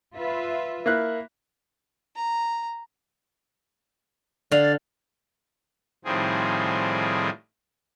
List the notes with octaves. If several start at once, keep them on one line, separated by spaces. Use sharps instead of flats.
F4 B4 E5
A#3 E4 F#6
A#5
D3 D5 F5
A2 D#3 F3 G3 C4 G#4